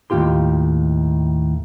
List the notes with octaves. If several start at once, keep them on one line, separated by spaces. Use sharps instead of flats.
D#2 A2 F4 G4 C6